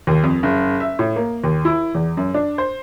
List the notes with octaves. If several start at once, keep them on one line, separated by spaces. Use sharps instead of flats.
D#2
F2
F#1
E5
A2
A#3
D#2
E4
E2
F#2
D4
C5